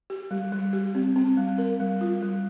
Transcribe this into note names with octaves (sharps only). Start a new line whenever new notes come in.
G4
G3
G3
G4
C4
C4
G3
A#4
G3
F4
G3